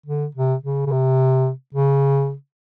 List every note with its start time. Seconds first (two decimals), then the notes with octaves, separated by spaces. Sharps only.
0.06 D3
0.35 C3
0.63 C#3
0.86 C#3
0.91 C3
1.74 C#3